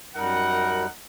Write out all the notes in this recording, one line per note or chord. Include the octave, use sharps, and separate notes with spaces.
F#2 G3 D#4 A#4 F#5